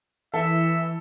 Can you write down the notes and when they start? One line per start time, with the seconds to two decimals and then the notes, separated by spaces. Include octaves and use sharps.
0.34 E3 A4 E5